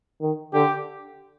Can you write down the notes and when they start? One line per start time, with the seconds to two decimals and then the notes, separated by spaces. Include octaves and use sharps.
0.21 D#3
0.53 D3 G4